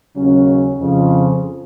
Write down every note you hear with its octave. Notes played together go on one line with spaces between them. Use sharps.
D#2 C#3 F#3 C#4
F2 C#3 F3